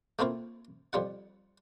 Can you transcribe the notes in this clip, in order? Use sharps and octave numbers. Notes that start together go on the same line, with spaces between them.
A3 A#3 C4 E4 F4
F2 G3 F4 F#5